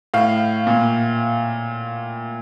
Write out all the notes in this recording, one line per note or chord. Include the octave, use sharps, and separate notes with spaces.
A2 F5
A#2